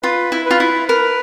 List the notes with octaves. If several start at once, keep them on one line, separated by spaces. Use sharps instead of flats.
F4 B4
E4
B4
F4
E4
A#4 B4